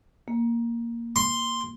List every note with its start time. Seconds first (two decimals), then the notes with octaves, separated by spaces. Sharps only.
0.28 A#3
1.16 C6